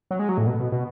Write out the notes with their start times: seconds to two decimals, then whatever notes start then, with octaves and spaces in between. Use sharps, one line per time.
0.11 F#3
0.19 G#3
0.29 F#3
0.38 A2
0.47 B2
0.60 B2
0.72 B2